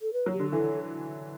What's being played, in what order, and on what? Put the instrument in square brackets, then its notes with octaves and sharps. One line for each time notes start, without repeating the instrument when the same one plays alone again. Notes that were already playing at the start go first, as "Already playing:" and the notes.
[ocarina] A4
B4
[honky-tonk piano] F#3
[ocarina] G4
[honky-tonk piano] D3
[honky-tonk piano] E3 [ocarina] A4